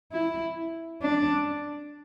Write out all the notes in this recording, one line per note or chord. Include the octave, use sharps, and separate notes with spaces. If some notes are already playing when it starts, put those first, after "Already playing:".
E4
D4